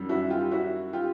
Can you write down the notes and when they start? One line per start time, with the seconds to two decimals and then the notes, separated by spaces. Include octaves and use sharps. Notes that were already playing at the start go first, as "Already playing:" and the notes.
Already playing: F#2 D#3 G3
0.09 E4 F#4
0.30 F4 G4
0.51 E4 F#4
0.93 F4 G4